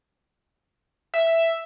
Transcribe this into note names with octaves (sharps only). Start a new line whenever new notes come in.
E5